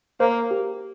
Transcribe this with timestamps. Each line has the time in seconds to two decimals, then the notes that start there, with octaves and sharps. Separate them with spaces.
0.20 A#3 C5
0.51 G4